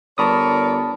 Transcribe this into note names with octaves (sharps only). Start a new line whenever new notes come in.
G1 A#4 C#5 D5 A5 B5 D#6